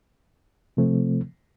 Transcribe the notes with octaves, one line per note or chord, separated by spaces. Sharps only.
C3 F3 A3 C4